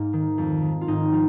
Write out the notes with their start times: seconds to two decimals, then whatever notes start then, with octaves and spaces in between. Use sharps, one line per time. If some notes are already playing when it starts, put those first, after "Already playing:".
Already playing: G#2 A#3 D#4
0.13 D#3
0.38 F2
0.62 D#3
0.81 F4
0.87 G#2 D#4
1.12 F3 F4